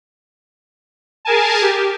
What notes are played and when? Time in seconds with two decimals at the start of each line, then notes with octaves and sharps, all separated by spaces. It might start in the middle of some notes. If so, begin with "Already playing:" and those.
1.25 G#4 A#4 G#5 A5
1.62 G4